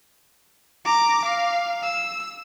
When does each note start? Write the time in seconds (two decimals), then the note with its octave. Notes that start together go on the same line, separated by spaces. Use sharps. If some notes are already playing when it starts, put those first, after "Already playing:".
0.85 A#5 D6
1.24 F5
1.83 E6